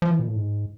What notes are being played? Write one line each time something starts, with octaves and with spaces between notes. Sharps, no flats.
F3
E3
A#2
A2
G#2